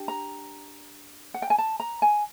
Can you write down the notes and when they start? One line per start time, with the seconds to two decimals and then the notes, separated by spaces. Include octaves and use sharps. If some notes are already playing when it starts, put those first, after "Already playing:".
Already playing: D4 G4
0.08 A#5
1.34 F#5
1.42 G5
1.50 G#5
1.58 A5
1.80 A#5
2.02 G#5